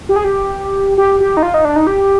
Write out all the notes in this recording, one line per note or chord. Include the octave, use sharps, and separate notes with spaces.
G4
G#4
G4
G4
G4
D#4
F4
D#4
D4
D#4
G4